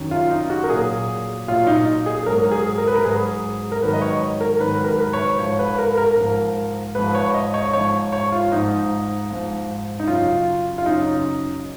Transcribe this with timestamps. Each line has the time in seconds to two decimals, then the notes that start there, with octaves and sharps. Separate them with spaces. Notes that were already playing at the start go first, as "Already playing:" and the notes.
Already playing: F#2 D#3 F#3
0.11 F4
0.30 D#4
0.50 F#4
0.64 A#4
0.69 A#2 F#3 G#4
1.48 A#2 F#3 F4
1.67 D#4
2.06 G#4
2.26 G#2 F#3 A#4
2.51 G#4
2.78 A#4
2.87 B4
2.95 A#4
3.04 G#2 F#3 G#4
3.72 A#4
3.82 G#2 D#3 F#3 B4
3.93 D#5
4.02 C#5
4.41 A#4
4.60 G#2 D#3 F#3 B4
4.84 A#4
4.99 B4
5.13 C#5
5.38 G#2 F3 C#5
5.59 B4
5.79 A#4
5.98 A#4
6.17 G#2 F3
6.95 G#2 F3 B4
7.15 C#5
7.34 D#5
7.54 C#5
7.73 G#2 F3 C#5
8.12 C#5
8.32 F4
8.52 G#2 F3 D#4
9.30 G#2 F3
10.00 D#4
10.07 F#2 C#3 F#3 F4
10.78 F4
10.86 F#2 C#3 F#3 D#4